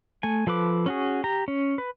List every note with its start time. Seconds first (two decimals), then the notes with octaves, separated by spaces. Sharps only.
0.23 A3 G#5
0.47 F3 A4 B4 D6
0.86 C#4 F#4 G#4
1.24 G4 A#5
1.48 C#4
1.78 B4